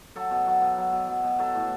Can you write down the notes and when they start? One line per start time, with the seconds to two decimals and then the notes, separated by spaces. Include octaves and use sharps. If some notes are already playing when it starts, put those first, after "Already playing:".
0.16 F#3 A4
0.31 B2
0.47 F#3
0.61 B2
0.78 F#3
0.93 B2
1.08 F#3
1.24 B2
1.39 F#3 A4
1.55 A2